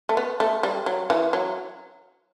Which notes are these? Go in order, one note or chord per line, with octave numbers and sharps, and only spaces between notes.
A3
B3
A3
G3
F#3
E3
F#3